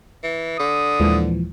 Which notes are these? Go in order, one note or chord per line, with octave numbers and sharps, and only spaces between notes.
E3
D3 D#6
D#2 A#2 E3 F3 G#3